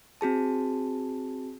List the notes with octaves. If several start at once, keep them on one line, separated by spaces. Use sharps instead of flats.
C4 F#4 G#4 A5